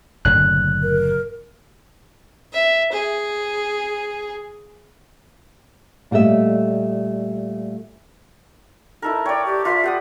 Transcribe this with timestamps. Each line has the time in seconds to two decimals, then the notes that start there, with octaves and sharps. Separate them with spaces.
0.25 F#1 A2 D3 F#6
0.83 A#4
2.53 E5
2.92 G#4
6.11 A#2 G3 A3 D#5 E5
9.02 D#4 E4 A4 A#4
9.26 C#5 D5 G5
9.45 G4
9.65 F4 B4 E5 C6
9.84 G4 F#5 D#6